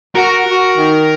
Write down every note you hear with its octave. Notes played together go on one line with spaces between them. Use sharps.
F#4 A#4
F#4
D#3